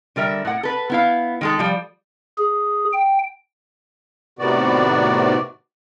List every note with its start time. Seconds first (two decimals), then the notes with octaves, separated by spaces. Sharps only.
0.16 D3 G3 A#4 E5
0.45 A2 F#5
0.63 A4 B4
0.90 B3 E4 F5
1.41 D#3 G#3 A4
1.59 F3 G3
2.38 G#4
2.93 G5
4.39 A2 C3 D#3 B3 F#4 D5